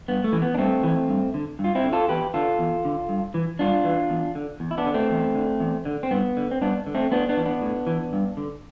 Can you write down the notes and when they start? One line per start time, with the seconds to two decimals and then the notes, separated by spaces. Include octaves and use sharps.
0.08 G2 B3
0.24 A3
0.33 E3
0.42 B3
0.54 D4
0.58 G2 A3 C4
0.83 E3
1.08 G2
1.34 D3
1.59 G2
1.64 F4
1.75 C4 E4
1.84 D3
1.93 F4 A4
2.09 E2 G4 B4
2.34 D3 F4 A4
2.59 E2
2.85 D3
3.09 G2
3.34 E3
3.59 G2 D4 F4
3.84 E3
4.10 E2
4.35 D3
4.60 E2
4.71 E4
4.78 B3 D4
4.86 D3
4.94 A3 C4
5.11 E2
5.35 D3
5.60 E2
5.85 D3
6.03 C4
6.11 G2 B3
6.37 D3
6.51 C4
6.61 G2 B3 D4
6.87 D3
6.95 A3 C4
7.11 A2 B3 D4
7.29 B3 D4
7.37 E3
7.45 B3 D4
7.62 A2
7.87 E3
8.13 G2
8.37 D3